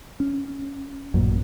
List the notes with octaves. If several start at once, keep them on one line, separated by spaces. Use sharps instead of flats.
C#4
A1 F#2 A#2